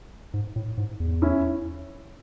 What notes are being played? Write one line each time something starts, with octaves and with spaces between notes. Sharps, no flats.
G#2
A2
G#2
E2
C#4 E4